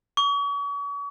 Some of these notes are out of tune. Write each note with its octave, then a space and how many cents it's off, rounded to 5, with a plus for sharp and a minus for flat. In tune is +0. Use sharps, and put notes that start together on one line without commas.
C#6 +40